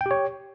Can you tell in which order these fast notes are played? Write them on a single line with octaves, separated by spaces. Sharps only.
G5 G4 C#5